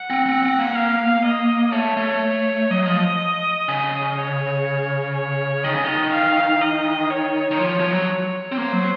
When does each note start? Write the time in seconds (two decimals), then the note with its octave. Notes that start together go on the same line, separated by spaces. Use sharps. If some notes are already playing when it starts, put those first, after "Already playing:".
Already playing: F#5
0.10 C4
0.26 C4
0.43 C4
0.59 A#3
0.75 F5
1.24 D#5
1.72 A3 C#5
1.97 A3
2.70 F#3 D#5
2.86 F3
3.68 C#3
4.16 C#5
5.15 C#5
5.64 D#3 D#5
5.74 C#3
5.84 D#3
6.12 F5
6.61 D#5
7.10 C#5
7.51 D#3
7.59 F3
7.80 F3
7.92 F#3
8.52 C4
8.57 A#3 C5
8.73 F#3